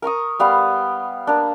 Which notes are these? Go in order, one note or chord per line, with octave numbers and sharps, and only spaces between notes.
A#4 A#5 C#6 D#6
G3 B3 F5 G5
A#3 D4